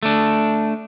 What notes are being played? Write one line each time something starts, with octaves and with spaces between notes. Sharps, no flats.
A3 D4